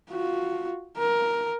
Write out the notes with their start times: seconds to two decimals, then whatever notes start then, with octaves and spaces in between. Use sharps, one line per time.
0.11 F4 F#4
0.98 A#4